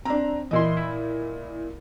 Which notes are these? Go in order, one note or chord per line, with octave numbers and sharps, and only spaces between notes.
C4 D4 A#5
A#2 E3 E4 D#5 C6
E4